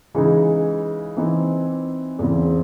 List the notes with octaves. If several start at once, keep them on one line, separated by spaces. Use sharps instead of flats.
C#3 E3 G#3 D#4
E3 C4 D#4
E2 C#3 E3 C4